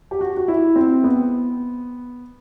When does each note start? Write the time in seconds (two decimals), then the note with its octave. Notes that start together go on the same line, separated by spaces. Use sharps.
0.11 G4
0.21 F#4
0.37 F#4
0.48 E4
0.76 C4
1.04 B3